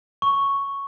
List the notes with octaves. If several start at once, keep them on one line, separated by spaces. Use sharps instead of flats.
C#6